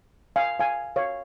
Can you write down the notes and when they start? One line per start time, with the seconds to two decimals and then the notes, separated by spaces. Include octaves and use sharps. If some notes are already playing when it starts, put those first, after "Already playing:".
0.36 F5 G#5
0.60 F5 G#5
0.96 C#5 F5